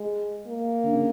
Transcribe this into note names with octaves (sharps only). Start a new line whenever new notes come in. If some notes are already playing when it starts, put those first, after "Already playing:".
Already playing: G#3
A#3
D3
C#3